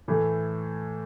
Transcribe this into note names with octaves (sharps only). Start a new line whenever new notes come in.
A2 E3 A3